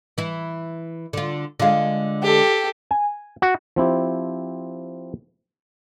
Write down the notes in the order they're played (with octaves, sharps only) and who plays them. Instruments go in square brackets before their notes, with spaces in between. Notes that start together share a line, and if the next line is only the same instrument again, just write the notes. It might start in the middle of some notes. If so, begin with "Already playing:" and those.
[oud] E3 E4
D3 F4
[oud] D3 G#3 [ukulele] F4 F5
[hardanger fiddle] G4 A4
[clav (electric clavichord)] G#5
F#4
F3 C4 E4 G4